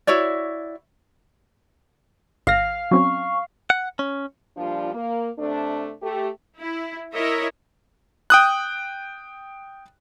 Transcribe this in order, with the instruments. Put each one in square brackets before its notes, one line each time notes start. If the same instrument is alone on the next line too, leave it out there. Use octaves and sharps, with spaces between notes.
[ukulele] E4 F#4 C#5 D5
[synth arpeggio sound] G#1 A#6 [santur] F5
[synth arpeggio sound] F#3 C4 C#4 [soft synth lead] C#6
[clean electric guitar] F#5
C#4
[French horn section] A#2 F3 G3 D4 F4
A#3
C3 A3 D4
A3 G4
[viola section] E4
E4 A#4 C#5 D#5 E5
[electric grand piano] G5 D#6 F#6